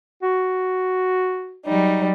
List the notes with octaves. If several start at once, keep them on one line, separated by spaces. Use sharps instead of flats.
F#4
F#3 G3 D#4